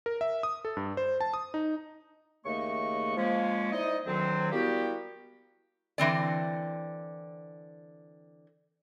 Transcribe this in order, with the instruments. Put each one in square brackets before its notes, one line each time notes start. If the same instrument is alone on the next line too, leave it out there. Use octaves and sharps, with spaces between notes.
[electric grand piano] A#4
E5
D#6
A4
G2
C5
A5
D#6
D#4
[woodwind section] D#2 C#3 A3 A#3 D#5 C#6
F3 G#3 A#3 C#4
D#4 E4 C5 D5 D#5
D2 D#3 F#3 C4
G3 A#3 B3 E4 F#4 G4
[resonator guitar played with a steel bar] D3 E3 C4 D5